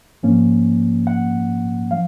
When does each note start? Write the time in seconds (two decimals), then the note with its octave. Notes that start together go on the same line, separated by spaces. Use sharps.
0.23 G#2 F3 A#3 C#4
1.07 F#5
1.91 F3 F5